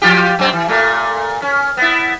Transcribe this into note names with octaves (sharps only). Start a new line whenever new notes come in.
F3 F4 G4
F#2 C4
E3
A#2 A3
C#4
B3 E4